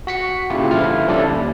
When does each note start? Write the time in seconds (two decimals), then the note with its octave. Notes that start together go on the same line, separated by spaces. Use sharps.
0.07 F#4 B6 C#7
0.50 A#2 C#3 E4 F4 G4
0.71 G2 D3 F3 E4 F4 F6
1.08 G3 C#4 D4 E4 A4 D5
1.29 D#2